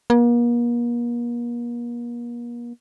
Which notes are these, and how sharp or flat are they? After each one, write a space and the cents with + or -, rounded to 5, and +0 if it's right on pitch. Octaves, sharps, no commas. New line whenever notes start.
A#3 +40